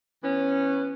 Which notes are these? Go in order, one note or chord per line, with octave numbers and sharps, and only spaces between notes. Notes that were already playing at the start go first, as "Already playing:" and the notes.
E3 B3 C#4